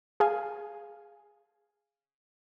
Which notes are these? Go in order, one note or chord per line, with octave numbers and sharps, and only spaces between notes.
G#4 F5 G#5